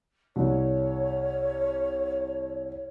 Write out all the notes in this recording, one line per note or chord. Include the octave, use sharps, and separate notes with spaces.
C2 C#5